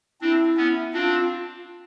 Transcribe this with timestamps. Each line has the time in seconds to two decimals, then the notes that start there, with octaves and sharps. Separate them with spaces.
0.21 C4 D4 E4
0.57 B3 C#4
0.93 C4 D4 F4